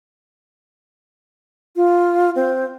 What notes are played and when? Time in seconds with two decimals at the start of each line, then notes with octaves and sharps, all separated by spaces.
1.76 F4
2.36 C4